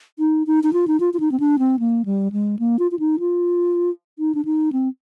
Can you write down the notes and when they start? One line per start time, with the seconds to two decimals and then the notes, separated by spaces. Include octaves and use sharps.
0.19 D#4
0.47 D#4
0.63 D#4
0.73 F4
0.88 D#4
1.00 F4
1.14 F4
1.20 D#4
1.32 C4
1.40 D4
1.59 C4
1.79 A#3
2.05 G3
2.32 G#3
2.59 A#3
2.79 F4
2.91 F4
2.99 D#4
3.20 F4
4.19 D#4
4.35 D4
4.45 D#4
4.73 C4